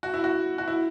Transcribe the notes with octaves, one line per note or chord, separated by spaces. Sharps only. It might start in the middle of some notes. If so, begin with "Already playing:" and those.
F#4
E4
F#4
F#4
E4